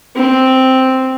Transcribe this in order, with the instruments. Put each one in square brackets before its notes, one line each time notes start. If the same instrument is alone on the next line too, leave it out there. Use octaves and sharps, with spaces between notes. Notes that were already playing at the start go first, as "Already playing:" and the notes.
[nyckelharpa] C4